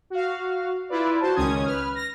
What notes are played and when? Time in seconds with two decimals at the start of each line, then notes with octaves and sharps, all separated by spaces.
0.10 F#4 F5
0.89 E4 F4 B4 D5
1.20 F#4 C5 A5
1.35 C#2 D#3 C#4 D#6 G#6
1.65 B4 F6
1.95 A#6